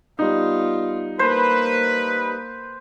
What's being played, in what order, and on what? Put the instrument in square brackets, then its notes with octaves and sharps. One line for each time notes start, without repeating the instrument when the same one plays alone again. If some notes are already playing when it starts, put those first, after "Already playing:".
[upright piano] G3 D#4 [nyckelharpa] B3 F4
[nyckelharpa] A#3 [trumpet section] B4 [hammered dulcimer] C5